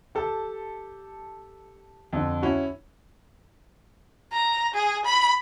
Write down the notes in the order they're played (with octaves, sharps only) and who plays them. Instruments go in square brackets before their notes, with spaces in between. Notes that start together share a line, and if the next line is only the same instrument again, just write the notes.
[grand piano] G4 A4 A5
F2 D3
C#4 E4 F#4
[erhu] A#5
G#4
B5